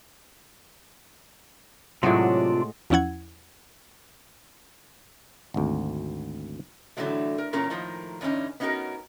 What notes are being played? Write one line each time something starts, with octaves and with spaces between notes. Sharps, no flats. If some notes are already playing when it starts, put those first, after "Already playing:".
A2 C3 F#3 G#3 D4 F4 F#4
E2 F3 C#4 E4 F#5 G#6
G#1 D2
A2 D3 E3 F#3 G#3 A3
A#4
E2 A#2 C#4 A#4 C#5 A#5
A2 D#3 F3 A#3
E2 G2 D3 C#4 D#4
B3 C#4 D#4 F4 F#4 A#4